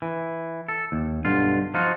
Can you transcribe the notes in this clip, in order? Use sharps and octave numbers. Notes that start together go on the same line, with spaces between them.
E3
A4
D#2
B1 G2 D3 F4
F3 D#4 F4 F#4